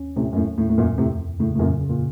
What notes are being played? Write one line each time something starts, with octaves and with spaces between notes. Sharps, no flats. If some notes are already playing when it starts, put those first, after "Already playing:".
Already playing: D#2 C#4
A2 C3 C#4
F#2
A2
D#2 A2
A2
F#2 A#2
F2 A2 C3
A2 C#3
A2
F#2 A#2
C#3
A#2